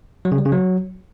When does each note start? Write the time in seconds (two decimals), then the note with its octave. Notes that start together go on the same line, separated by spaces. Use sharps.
0.25 F#3
0.32 C#3
0.38 G3
0.45 C#3
0.52 F#3